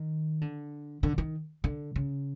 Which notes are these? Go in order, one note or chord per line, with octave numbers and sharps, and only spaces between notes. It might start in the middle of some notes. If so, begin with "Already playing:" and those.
Already playing: D#3
D3
D3
D#3
D3
C#3